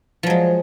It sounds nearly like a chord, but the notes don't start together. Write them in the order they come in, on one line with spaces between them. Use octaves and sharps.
F3 F#3 G#3